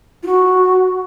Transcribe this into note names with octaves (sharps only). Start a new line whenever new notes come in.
F4
F#4